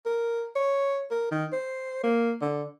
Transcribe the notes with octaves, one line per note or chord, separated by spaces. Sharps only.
A#4
C#5
A#4
D#3
C5
A#3
D3